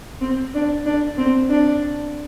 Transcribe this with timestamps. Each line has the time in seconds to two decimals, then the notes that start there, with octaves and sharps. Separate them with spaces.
0.21 C4
0.54 D4
0.86 D4
1.18 C4
1.50 D4